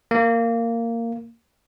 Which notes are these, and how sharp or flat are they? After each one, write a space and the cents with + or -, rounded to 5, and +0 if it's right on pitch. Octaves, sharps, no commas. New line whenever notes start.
A#3 -15